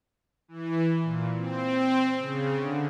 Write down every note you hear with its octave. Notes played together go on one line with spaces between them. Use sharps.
E3
A#2
C4
C#3
D3